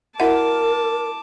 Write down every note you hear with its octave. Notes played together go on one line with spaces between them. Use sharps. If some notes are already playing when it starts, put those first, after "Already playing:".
E4 F#4 A#4 E5 F#5 A5 D6